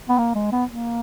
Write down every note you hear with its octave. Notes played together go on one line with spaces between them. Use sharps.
B3
A#3
G#3
B3
A#3